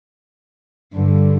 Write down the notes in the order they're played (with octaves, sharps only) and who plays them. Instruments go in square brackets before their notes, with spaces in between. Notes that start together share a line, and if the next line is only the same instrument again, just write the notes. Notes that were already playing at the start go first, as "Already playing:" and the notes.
[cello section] G2 D3